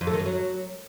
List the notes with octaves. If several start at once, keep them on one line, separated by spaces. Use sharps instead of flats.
F2
A3
D#3
F#2
F#3